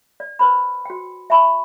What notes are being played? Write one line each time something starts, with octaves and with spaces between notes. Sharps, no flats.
D5
B4 C5 B5
F#4 G5
E5 G#5 A5 B5 C#6